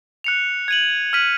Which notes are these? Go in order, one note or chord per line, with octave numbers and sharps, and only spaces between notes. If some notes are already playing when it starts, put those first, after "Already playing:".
F#6 C#7 F7
G#6 D#7 F#7
F6 B6 D#7 F#7